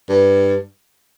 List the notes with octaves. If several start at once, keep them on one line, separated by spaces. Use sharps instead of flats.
G2